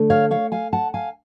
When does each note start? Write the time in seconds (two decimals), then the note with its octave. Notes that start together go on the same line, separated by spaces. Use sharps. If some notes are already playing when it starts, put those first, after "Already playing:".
Already playing: D3 A3
0.10 C#5 F5
0.31 C#5 F5
0.52 F5 G#5
0.73 F#5 A5
0.94 F5 G#5